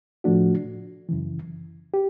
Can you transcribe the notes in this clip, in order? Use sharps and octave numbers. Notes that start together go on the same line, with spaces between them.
A2 F3 A3 D4 F#4
F#2 C#3 E3
G4